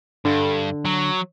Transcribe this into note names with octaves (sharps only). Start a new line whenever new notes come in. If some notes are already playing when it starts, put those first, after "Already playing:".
G2 D3
F#3